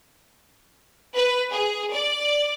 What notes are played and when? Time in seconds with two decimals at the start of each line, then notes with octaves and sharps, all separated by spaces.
1.15 B4
1.50 G#4
1.92 D5